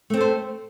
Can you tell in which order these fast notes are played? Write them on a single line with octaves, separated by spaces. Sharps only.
A3 C4 A4 C5